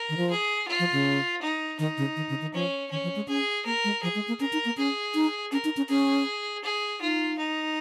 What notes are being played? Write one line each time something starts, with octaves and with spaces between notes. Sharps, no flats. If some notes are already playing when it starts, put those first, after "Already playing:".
Already playing: A#4
D#3
F3
G#4
F4
F3
C#3
D#4
D#3 D#4
C#3
D#3
C#3
D#3
F3 C#4
D#3 C#4
F3
G#3
C#4 G#4
A#3 A#4
G#3
F3 G#4
G#3
A#3
C#4 A#4
D#4
A#3
C#4 G#4
D#4
C#4 A#4
D#4
C#4
C#4 G#4
G#4
D#4 F4
D#4